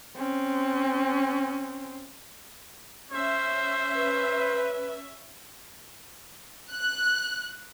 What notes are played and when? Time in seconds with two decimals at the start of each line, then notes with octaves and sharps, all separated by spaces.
0.17 C4 C#4
3.12 C#4 C5 E5
3.95 B4
6.72 F#6